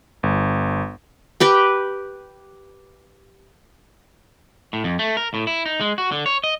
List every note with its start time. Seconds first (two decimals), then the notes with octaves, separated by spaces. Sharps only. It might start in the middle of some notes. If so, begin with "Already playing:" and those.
0.23 G1
1.40 G4 B4 G5
4.73 A2
4.84 F2
4.99 A3
5.17 A#4
5.34 A2
5.47 E4
5.66 D#4
5.81 G#3
5.98 F#4
6.12 D3
6.26 C#5
6.44 D#5